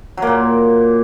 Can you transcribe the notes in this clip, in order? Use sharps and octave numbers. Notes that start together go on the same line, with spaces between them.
A#2 F#3 A#3